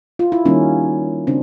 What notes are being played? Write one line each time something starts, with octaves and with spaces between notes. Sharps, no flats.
F4
E4
D#3 G3 A#3 C#4 D#4
C#3 C4 D4